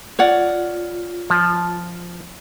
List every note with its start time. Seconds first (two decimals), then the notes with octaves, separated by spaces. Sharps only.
0.19 F4 C#5 D5 F#5
1.30 F3